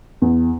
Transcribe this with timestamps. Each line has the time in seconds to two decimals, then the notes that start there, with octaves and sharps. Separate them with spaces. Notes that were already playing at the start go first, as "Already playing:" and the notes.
0.22 E2